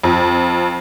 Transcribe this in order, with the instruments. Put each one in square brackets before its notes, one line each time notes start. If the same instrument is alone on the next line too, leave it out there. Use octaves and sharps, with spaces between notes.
[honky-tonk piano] F2